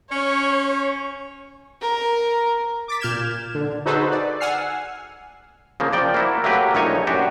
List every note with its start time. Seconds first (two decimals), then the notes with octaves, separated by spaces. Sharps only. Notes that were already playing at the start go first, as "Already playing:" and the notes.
0.12 C#4 C#5
1.81 A#4
2.88 D6 A6 B6
3.00 A#2 F6 G6 G#6 E7
3.55 D3
3.86 D#4 F#4 G#4 A4 B4 C5
4.11 D5
4.40 F#5 G#5 E6 F6 C7
5.80 C#3 F3 A#3
5.93 F3 D5 G5
6.14 A#3 E4 F#4
6.44 F#3 A3 A#3 G4 B4
6.75 A#1 A2 D#4 C#5 D#5 G#5
7.07 F#2 D4 F#4 G4